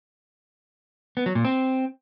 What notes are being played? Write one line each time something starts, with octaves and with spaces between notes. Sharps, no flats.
B3
F#3
A#2
C4